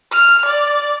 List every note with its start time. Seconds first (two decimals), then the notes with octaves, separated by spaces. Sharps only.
0.11 F6
0.45 D5